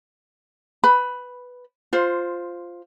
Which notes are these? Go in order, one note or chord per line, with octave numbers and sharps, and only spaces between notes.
B4 B5
F4 C5